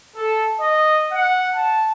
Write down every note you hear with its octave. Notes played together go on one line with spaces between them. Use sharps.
A4
D#5
F#5
A5